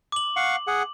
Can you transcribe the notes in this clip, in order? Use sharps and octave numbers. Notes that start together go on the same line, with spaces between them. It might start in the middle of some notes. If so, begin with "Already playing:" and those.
D6 F#7
F5 F#5 C#6
G#4 F#5